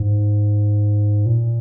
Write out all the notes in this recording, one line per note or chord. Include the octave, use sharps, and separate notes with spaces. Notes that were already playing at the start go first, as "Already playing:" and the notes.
Already playing: G#2
A#2